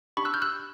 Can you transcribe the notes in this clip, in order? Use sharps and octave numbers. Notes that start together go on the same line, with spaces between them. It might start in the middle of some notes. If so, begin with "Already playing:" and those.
D4 G4 B5 C#6
E6 F#6
F6 G6
E6 F#6